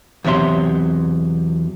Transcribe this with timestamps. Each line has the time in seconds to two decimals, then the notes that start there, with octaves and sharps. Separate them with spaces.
0.24 E2 C3 F#3 E5 C6